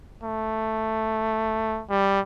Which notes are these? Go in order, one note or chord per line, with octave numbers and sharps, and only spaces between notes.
A3
G3